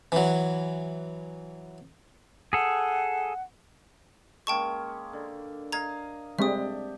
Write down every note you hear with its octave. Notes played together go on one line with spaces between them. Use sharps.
E3 F#3
G#4 A4 F#5
G#3 A#3 C#4 G5 A5 C#6
D3
D#5 F5 A#5 G#6
G3 G#3 C4 D4 G4 E5 D#6